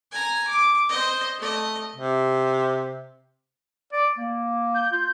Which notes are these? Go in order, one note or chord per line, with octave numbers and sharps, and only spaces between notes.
G#5 A#5
D6
C5 D#5
A3 D#5
C3
D5
A#3
G6
F4